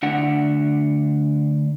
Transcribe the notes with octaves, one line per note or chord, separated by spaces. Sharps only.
D2 D4 F#5